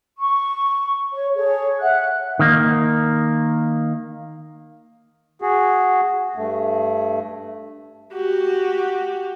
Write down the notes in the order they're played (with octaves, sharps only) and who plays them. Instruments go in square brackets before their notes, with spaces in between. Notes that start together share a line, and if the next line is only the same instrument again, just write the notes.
[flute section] C#6
C#5
G#4 A4 C#5
E5 F#5 F#6
[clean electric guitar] D#3 A#3
[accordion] F#4 G#4
G2 A3
[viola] F#4 G4